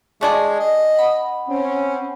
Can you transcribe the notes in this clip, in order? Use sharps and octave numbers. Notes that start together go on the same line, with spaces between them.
G#3 A3 D4 G#4
D#5
F#5 B5
C4 C#4